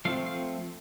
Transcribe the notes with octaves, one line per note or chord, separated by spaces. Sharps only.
F3 A3 C4 F5
F5